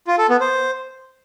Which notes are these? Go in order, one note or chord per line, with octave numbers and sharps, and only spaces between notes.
F4
A4
B3
C5